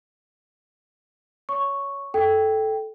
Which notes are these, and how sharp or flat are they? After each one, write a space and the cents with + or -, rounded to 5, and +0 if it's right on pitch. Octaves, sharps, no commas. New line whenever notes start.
C#5 +15 C#6 +0
A4 -10 G5 +0